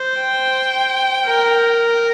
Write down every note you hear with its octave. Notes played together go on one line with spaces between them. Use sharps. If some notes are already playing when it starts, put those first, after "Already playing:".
Already playing: C5
G5
A#4